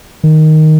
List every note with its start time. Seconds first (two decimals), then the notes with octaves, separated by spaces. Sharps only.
0.24 D#3